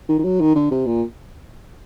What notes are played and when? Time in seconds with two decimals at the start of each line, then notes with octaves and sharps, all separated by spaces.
0.09 D#3
0.19 D#3
0.24 F#3
0.40 D#3
0.55 D3
0.71 C3
0.86 A#2